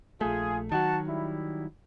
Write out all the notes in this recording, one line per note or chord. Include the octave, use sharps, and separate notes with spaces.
A#1 A3 F4 G#4
D#3 F#3 F#4 F#5 A5
G3 E4